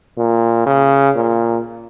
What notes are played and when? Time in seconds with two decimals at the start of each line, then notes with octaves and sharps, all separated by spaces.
0.17 A#2
0.66 C#3
1.16 A#2